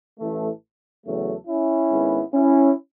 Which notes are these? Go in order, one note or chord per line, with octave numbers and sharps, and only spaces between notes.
A1 A2 E3 A3
E2 C#3 F#3 A3
C#4 E4
G#1 G#2 G#3 B3
C#4 E4